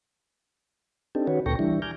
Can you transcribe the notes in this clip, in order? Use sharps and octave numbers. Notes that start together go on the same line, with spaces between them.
C4 D4 D#4 G4 A4
D#3 C#4 F#4 B4 C#5
D2 A#2 A4 G5 C#6 A#6
E3 G3 D4 E4
G#5 A#5 D6 F6 G6